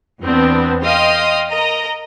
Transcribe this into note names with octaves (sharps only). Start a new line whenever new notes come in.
E2 B3 C4 D4
D#5 F5 G5 C6 D#6 F6
A#4 D#5 A#5 D#6